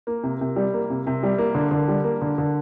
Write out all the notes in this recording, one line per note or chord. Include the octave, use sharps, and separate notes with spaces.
A#3
C3
C3
G3
A#3
C3
C3
G3
A#3
D3
D3
G3
A#3
D3
D3